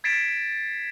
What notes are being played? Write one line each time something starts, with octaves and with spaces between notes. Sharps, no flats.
G#6 A6 B6 C7 D7 E7